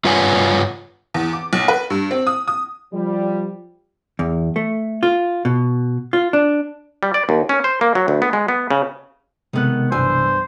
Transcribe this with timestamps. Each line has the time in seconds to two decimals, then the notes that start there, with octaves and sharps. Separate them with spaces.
0.04 G2 F4 B4 C#5 F#5 G#5
1.14 E2
1.33 D6
1.53 B1
1.68 B4
1.90 G2
2.11 C4
2.27 D#6
2.48 D#6
2.93 F3 G3
4.19 E2
4.56 A3
5.03 F4
5.45 B2
6.13 F4
6.33 D4
7.03 G3
7.14 D5
7.29 D#2
7.49 C#4
7.64 C5
7.81 A#3
7.95 F#3
8.08 D2
8.22 B3
8.33 G#3
8.48 B3
8.71 C#3
9.53 C3 D#3 G#3 B3 A4 F#6
9.92 B1 G2 E3 C5 G#5 E6